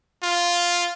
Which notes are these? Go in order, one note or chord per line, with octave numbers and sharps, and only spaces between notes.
F4